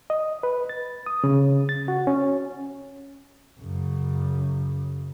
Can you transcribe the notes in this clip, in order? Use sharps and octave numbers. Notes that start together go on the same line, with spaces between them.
D#5
B4
A6
D#6
C#3
A6
F#4
C#4
F#2 C#3